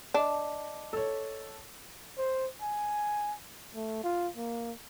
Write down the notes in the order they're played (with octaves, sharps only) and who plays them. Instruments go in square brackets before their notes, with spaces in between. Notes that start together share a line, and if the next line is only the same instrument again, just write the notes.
[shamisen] D4 [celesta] D#5 A5 D6
[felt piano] A4 C#5
[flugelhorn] C5
G#5
A3
F4
A#3